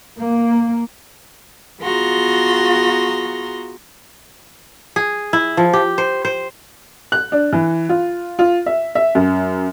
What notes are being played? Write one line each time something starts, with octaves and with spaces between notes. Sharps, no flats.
A#3
B3 F4 F#4 G#4 A#5 C6
G#4
E4
F3
G4
C5
C5
F#6
D4
E3
F4
F4
E5
E5
F#2